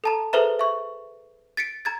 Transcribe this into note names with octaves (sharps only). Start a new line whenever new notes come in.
A4 A5 A#5
G#4 A4 B4 C5 E5 A#5
E5 C#6
A6 B6 C#7 D7
A#5 G#6 A6